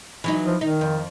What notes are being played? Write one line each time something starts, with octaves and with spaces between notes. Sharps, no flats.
E3 F#3 D#4
F3
D#3 D#4
F2